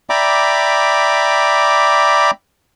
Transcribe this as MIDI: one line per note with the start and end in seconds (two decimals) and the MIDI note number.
0.10 2.31 74
0.10 2.31 76
0.10 2.31 79
0.10 2.31 82
0.10 2.31 83
0.10 2.31 86